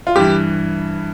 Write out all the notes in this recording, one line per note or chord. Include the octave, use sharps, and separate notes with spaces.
F4
G2 E3 G4